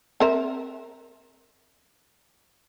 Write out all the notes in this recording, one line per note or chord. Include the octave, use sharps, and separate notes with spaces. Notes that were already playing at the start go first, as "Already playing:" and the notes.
C4 A#4 E5